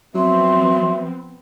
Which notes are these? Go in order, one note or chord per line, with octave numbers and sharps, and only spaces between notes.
F3 F#3 B3 C4 E5 C6